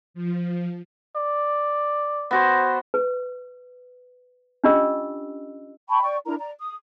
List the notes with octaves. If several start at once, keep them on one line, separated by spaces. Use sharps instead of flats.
F3
D5
B3 F#4 C5
B4
C#4 D4 F4 G4 D#5 E6
G5 A5 B5 C#6
D5 G5 C#6
D4 E4 A#4 A#5
D5 A#5
D#6